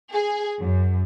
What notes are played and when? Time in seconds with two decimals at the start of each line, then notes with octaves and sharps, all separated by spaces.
0.11 G#4
0.61 F#2